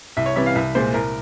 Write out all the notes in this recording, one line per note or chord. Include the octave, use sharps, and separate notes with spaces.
C2 E5
C#5
C3 E3 G3 E5
F5
C2 E5
A#2 G#3 C5
C2 A#4